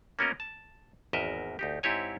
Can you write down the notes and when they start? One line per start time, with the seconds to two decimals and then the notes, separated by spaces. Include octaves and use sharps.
0.19 A#3 B3 C#4 F#4 A#4 D#5
0.40 A5
1.13 G#1 E2 A#4 D#5 E5
1.59 D2 D#4 G4
1.83 G#2 C4 E4 G4 C#5 G#5